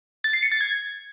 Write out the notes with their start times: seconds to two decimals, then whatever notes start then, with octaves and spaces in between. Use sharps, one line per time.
0.24 A6
0.33 C7
0.42 C#7
0.52 A6
0.61 G#6